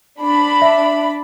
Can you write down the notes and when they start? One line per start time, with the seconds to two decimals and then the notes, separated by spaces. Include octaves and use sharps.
0.21 D4 B5
0.62 E5